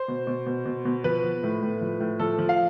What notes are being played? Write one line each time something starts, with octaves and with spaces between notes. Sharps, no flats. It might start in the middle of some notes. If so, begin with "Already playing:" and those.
Already playing: C5
B2
B2
B2
B2
B2
F3 B4
F3
A2
A2
F3
A2
F3 A4
F3
F5